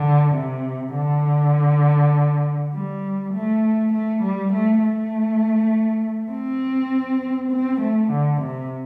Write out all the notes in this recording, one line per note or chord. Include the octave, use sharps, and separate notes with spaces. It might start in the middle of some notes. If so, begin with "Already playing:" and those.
Already playing: D3
C3
D3
G3
A3
A3
G3
A3
A3
C4
C4
A3
D3
C3